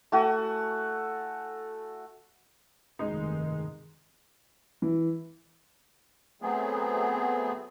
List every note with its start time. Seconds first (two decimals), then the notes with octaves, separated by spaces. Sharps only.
0.12 A3 F#4 G#5
2.99 F1 G2 D#3 G#3 D#4
4.82 E3
6.42 F#3 A3 B3 C4 G#4